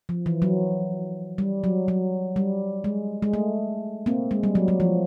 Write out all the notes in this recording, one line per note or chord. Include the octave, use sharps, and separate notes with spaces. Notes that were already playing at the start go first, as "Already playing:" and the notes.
F3
E3
F#3
G3
F#3
F#3
G3
G#3
G#3
A3
A#3 C4
G#3
G3
F#3
F#3
F3